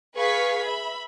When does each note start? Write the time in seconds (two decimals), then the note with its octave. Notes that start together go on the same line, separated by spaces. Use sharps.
0.15 G#4 B4 F5 C#6 G#6 B6
0.65 E5 B5